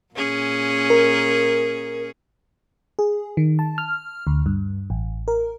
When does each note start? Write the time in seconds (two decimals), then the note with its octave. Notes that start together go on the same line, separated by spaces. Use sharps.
0.14 A#2 C#4 G#4
0.90 A#4
2.99 G#4
3.37 D#3
3.59 A5
3.78 F6
4.27 D2
4.46 G2
4.90 A1
5.28 A#4